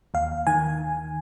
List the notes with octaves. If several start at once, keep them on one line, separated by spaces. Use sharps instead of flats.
D#2 F5
D#3 G#5